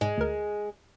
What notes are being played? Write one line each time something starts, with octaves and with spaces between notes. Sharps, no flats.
G#2 G#3
D2 A#4